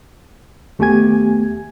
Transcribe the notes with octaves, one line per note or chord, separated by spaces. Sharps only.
D#2 A3 B3 G4 G#5 G#6